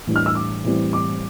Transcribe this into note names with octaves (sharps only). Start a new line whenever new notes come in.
A2 E3 G3 D4
F6
E6
D6
A2 E3 G3 C4
D6